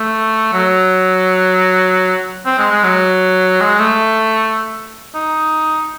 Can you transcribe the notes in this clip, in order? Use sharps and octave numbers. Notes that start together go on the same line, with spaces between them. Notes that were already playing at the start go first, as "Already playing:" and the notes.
Already playing: A3
F#3
C4
G#3
G#3
F#3
G#3
A3
D#4